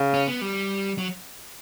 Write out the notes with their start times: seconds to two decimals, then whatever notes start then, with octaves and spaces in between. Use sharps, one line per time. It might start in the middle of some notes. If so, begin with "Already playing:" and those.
Already playing: C#3
0.14 C#4
0.27 B3
0.41 G3
0.98 F#3